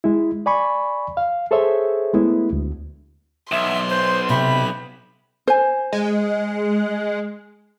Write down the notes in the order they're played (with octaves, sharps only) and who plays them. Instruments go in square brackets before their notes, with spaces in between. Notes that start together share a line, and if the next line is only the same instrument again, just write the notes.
[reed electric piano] G#3 E4
D5 G#5 B5 C#6
F5
G#4 A4 C5 C#5 E5
G#3 A3 B3 E4
D2
[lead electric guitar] B1 [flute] E5 [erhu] C6
[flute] C5
[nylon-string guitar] C3 [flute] B5
[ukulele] C5 G#5
[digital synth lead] G#3